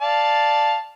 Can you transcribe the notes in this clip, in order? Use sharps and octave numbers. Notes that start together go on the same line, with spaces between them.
D5 F5 A5